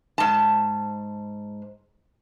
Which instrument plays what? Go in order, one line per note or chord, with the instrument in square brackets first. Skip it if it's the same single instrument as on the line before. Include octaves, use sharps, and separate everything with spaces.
[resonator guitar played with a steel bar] G#2 A5